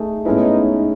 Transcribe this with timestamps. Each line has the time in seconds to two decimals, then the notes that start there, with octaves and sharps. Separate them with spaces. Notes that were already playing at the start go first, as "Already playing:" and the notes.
Already playing: A3 D#4 G#4
0.26 A2 G#3 B3 C#4 D#4 E4 B4